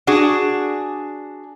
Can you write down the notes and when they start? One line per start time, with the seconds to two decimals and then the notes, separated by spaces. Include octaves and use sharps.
0.07 D4 F#4 G#4